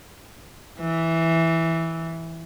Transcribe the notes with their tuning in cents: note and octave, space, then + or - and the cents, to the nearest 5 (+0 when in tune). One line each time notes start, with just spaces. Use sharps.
E3 -5